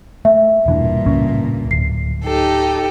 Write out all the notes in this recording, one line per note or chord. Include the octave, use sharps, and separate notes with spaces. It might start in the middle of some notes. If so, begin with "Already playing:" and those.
A3 E5
E1 G2 A#2 E3 D4
C#2 A2 C#4
D1 C7
D#4 G4 A4